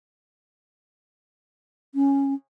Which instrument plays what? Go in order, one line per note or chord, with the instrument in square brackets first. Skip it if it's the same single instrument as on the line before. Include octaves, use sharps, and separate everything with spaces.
[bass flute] C#4